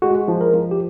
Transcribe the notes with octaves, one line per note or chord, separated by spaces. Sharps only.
G#3 F#4
F3
A#4
F3
G4